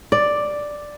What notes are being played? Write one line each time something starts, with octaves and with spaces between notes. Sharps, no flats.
D5